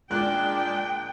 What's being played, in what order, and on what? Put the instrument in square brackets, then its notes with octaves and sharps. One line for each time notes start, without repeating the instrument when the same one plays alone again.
[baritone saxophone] A#2 [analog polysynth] G#3 D4 [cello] G5 [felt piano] F#6